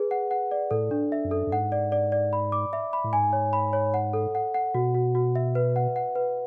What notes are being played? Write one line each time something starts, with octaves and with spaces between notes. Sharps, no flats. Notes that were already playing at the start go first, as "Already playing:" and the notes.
Already playing: G#4 B4
F#5
F#5
D5
A2 A4
D4
E5
F#2
A4
F#2
G#2 F#5
D5
D5
D5
B5
D6
E5
B5
A2
G#2 G#5
C#5
B5
C#5
F#5
A4
F#5
F#5
B2 F#4
F#4
F#4
E5
B4
F#5
F#5
B4